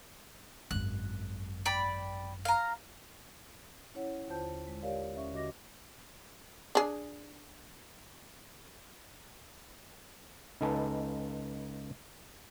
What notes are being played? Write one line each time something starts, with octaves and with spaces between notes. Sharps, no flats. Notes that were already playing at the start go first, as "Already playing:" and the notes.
G#1 F#2 F#6
D5 G5 B5
F5 A#5
C#4 E4 C#5 F#5
D#2 D3 F4 C5 A5 G6
G#3
G4 A#4 C#5 D5 F5
D#2 C#4 E5 C#6
D3 F#4 D#5 D6 A#6
D4 G#4
C#2 D#4 A4 B4 G#5 A5